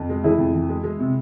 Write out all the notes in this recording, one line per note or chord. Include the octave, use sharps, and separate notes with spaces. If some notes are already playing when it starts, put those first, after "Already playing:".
Already playing: F2
G#3
E3 E4 G#4
F2
E3
G#3
G#3
C3